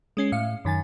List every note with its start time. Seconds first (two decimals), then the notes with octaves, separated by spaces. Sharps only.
0.17 G#3 C#4 C7
0.32 A2 F5 C#7
0.65 F#2 D#3 G#5 A6